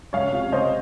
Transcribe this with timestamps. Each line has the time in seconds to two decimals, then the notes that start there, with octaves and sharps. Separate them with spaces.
0.13 C#2 C#5 F5
0.33 C3
0.52 C#2 C5 D#5